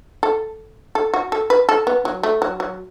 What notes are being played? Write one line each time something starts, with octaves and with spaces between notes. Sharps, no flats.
A4
A4
F#4
A4
B4
A4
B3
F#3
A3
F#3
F#3